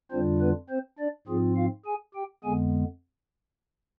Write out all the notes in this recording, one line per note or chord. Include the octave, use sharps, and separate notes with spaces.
F2 D3 G3 C4 D4 F4 C5
B3 B4
C4 C5
D4 D5
G#2 F3 C4 F4 G#4
F4 F5
G#4 G#5
G4 G5
F2 D3 G#3 B3 G#4 G#5